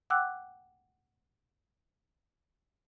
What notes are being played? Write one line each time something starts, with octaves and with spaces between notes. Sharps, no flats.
F#5 G5 D6 E6 F#6